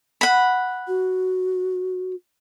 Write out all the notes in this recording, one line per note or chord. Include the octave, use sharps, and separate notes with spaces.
F#5 B5
F#4